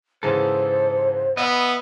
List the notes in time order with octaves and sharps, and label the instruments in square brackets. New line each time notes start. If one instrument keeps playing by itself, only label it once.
[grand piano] G#2 C#3 E3 [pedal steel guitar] A4 D#5 A5 [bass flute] C5
[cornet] B3 [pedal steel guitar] D#5 E5 B5